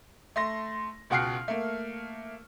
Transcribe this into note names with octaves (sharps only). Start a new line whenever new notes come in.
A3 C6 A#6
C#2 B2 F#5 G5 F6 C7
A3 A#3